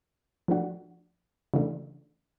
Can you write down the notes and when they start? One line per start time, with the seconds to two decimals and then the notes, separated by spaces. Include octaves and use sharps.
0.48 F3 A3 D4 F#4
1.54 C#3 E3 A3 D4